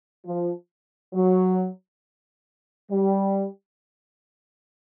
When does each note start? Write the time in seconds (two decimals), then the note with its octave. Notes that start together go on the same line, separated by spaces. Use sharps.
0.24 F3
1.13 F#3
2.91 G3